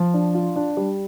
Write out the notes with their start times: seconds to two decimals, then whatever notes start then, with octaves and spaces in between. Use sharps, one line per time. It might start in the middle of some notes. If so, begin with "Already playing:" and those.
Already playing: F3
0.14 D4
0.35 F4
0.56 D4
0.77 G3